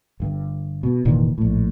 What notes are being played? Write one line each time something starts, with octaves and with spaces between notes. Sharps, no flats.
G1 G2
B2
F1 A#2 D#3 E3
A#1 A2